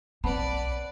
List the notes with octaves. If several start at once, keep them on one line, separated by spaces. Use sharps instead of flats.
B1 C4 B4 D5 F#5 A5 B5